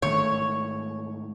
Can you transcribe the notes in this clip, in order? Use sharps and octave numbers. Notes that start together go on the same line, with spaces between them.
G#2 D#3 A3 C#5